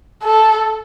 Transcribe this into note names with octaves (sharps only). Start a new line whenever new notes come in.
A4